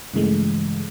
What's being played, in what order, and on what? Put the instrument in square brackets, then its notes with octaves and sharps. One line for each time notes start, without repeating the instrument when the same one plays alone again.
[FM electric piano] G2 C#3 E3 G#3 A3